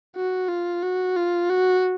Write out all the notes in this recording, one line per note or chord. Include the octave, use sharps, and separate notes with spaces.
F#4
F4
F#4
F4
F#4